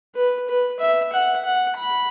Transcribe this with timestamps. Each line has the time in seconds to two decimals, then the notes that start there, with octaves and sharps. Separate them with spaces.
0.15 B4
0.48 B4
0.79 E5
1.12 F#5
1.45 F#5
1.77 B5